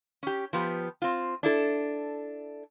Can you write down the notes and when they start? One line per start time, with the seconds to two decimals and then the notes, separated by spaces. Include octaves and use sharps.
0.23 C#4 G4
0.53 F3 B3 G4
1.02 C4 F4
1.43 D4 E4 A4